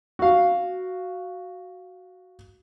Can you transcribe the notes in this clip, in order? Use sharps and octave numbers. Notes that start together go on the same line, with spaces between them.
F#4 F5